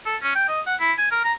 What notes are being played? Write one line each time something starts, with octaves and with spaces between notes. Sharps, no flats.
A4
C#4
G5
D#5
F#5
E4
G#5
A#4
A#5